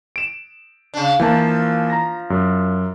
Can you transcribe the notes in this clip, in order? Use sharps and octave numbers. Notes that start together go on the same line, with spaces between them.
D7 E7
C#3 D4
E3 F3 A#3 A5
A#5 A#6
F#2